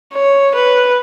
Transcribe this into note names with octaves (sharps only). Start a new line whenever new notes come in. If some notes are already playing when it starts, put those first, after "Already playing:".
C#5
B4